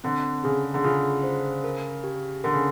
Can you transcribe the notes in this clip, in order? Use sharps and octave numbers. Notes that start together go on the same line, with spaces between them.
D3 C4
C#3 G#4
D3
C#3 F4
C5
A#4
G4
D3 A#4
C#3